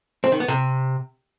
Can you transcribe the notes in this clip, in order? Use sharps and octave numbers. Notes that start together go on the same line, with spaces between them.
C4
D#3
B3
C3